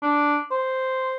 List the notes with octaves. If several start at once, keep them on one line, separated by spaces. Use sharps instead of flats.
D4
C5